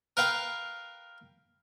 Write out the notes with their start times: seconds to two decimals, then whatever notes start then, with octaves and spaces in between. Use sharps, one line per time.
0.17 A#4 B4 F5 G5